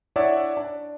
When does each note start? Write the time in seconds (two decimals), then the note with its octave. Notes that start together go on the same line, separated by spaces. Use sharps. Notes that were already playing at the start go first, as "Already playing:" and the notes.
0.16 D4 E4 C#5 D5 E5 F#5
0.57 D4